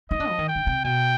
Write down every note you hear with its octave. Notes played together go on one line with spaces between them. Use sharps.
D#4 D#5
D4
F3
D#3
G5
D3
C3
B2 G5